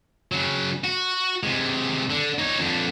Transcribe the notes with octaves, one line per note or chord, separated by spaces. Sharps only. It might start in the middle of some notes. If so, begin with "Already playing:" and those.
C#3 F#3
F#4
C3 G#3
D3
D#4 C#5
F2 D3